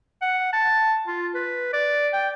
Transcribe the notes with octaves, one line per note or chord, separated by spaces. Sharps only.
F#5
A5
F4
B4
D5
G5